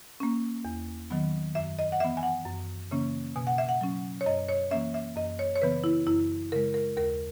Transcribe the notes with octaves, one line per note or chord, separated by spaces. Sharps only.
A#3 C#4
E2
D#3 F#3 B3
F#2 E5
D#5
F#5
E3 B3 E5
G#5
F#5
F#2
C#3 E3 A#3 C#4
B2 G#5
F#5
E5
F#5
F#3 C#4
C#5
F#2 D#5
C#5
E3 A#3 C#4 E5
E5
F#2 D#5
C#5
C#5
C#3 E3 B3 B4
E4
F#2 E4
C#3 G#3 A#4
A#4
D#2 A#4